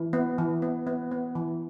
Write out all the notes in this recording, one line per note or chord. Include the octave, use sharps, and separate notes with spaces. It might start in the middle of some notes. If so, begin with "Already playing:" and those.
Already playing: E3
B3
E3
B3
B3
B3
E3